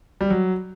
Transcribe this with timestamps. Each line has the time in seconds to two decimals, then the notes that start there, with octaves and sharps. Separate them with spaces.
0.21 G3
0.30 F#3